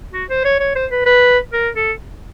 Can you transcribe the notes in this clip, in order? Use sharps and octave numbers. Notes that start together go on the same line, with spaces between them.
F#4
C5
C#5
C#5
C5
B4
B4
A#4
A4